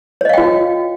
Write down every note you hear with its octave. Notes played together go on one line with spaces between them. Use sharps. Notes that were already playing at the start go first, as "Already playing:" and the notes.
F4 C#5 D#5 F5 G5